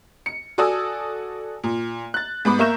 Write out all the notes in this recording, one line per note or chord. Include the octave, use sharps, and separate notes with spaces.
C#7
F#4 A4 D5 G#5 D#6 E6
A#2
F#6 A6
G#2 B3 B5 D6
A#3 A#4 E5 C#6 G6 E7